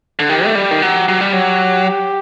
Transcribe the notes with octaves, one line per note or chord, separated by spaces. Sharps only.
D3
D#3 G4
A3
G3
D#3
F#3
F#3
G3
F#3